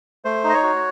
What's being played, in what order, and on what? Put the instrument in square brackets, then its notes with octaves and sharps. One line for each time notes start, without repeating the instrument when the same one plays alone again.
[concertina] A3 C5
D#4
D#5
C#5
F#4